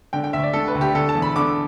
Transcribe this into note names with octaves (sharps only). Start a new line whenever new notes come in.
D3 G5
G5
D2 E5
D5
D3 A4
B4
D2
G4
D3 A4
A5
E2
B5
D3 D6